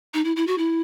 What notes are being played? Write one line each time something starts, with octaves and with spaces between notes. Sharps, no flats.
D#4
E4
E4
F#4
E4